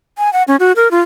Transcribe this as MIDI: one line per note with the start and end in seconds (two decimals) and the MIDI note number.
0.18 0.32 80
0.33 0.43 78
0.48 0.56 61
0.60 0.72 66
0.76 0.91 70
0.91 1.00 65